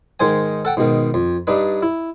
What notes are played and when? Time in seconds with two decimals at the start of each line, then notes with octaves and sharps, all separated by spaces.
0.20 G#2 D#3 G#3 C5 G#5
0.65 A4 F#5 G5
0.77 G#2 B2 D#3
1.14 F2
1.47 G2 D4 D#4 B4
1.82 E4